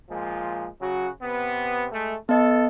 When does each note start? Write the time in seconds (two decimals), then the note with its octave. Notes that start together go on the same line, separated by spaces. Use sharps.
0.10 A#2 F3 G#3
0.81 C#3 F#3 F#4
1.22 C3 B3
1.92 G#3 A3
2.29 B3 A4 D#5